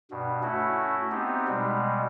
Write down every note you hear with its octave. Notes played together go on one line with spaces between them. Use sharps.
G2 B2
A3 C#4 E4 F#4
B3 C4 D#4 G4
B2 G3 G#3